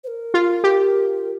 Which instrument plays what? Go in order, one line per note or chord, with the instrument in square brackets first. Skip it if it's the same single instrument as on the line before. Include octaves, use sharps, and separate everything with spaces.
[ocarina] C5
A#4
[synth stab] F4
G4